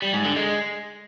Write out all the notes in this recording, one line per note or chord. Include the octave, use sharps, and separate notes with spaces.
G3
G#2
D3
G#3